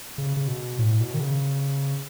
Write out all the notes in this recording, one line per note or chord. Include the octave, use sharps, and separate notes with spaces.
C#3
C#3
B2
A2
B2
D#3
C#3